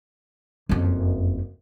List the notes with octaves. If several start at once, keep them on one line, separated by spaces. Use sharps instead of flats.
F#1 F2